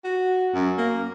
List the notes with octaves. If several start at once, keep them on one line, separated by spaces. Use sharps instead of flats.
F#4
F#2
A#3